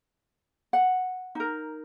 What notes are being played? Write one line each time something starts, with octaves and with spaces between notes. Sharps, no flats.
F#5
D#4 A#4